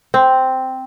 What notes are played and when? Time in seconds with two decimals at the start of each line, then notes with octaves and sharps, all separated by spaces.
0.14 C4